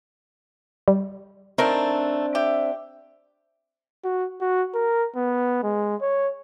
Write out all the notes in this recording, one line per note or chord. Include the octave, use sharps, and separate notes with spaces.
G3
D#3 A3 C4 D4 A#4
G4 E5
F#4
F#4
A#4
B3
G#3
C#5